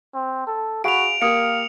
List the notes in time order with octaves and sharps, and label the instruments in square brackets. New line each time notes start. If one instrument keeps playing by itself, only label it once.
[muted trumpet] C4
A4
[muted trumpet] F#4 [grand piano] G#4 F5 B5 [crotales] D7 F7
[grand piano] A#3 G4 [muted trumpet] F5 [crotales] D#6 C#7